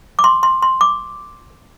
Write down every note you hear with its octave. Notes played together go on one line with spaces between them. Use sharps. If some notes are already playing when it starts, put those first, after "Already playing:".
D6
C6
C6
C6
D6